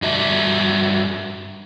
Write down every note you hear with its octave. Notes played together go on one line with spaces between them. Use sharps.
G2 F#4 E5 A5